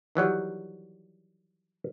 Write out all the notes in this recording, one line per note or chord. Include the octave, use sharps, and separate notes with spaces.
D#3 E3 F#3 G3